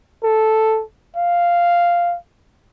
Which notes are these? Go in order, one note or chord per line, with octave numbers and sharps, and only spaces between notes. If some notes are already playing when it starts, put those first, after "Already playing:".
A4
F5